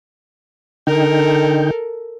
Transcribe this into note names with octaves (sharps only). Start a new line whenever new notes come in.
D3 D#4 A4 A#4 G5